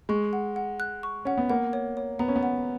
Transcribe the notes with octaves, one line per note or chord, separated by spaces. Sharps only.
G#3 C#6
F#5
F#5
F#6
C#6
C#4 F#5
B3
A#3 F#5
C#5
C#5
B3 A#5
C#4
B3
F#5